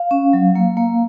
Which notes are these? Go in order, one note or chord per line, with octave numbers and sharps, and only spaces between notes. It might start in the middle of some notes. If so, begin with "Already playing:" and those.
Already playing: F5
C#4
F#3
A#3
A#3